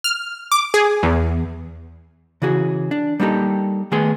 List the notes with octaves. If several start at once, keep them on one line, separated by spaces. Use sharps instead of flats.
F6
D6
G#4
E2
C#3 E3 F#4 G#4
D4
G3 A#3 B3 D#4 G4 A4
D#3 A3 B3 G#4 G#5 C6